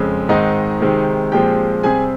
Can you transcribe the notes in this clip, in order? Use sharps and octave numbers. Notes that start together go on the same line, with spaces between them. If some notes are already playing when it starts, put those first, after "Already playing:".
Already playing: F2 C#3 G#3 C4
G#2 D#3 G#3 C4 D#4 D#5
C3 D#3 G#3 C4
A#2 F3 G#3 C4 G4 G5
C3 G3 C4 G#4 G#5